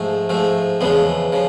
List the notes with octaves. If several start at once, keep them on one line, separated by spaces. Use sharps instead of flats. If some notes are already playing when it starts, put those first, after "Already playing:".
Already playing: G#2 F3 A3
G#2 F3 A3
E2 C#3 F3 G#3 B3
C#3 F3